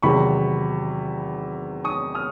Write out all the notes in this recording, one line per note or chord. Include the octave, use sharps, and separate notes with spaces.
E2 C3 D#3 F#3 B5 C#6
C#6 D#6
D#6 F6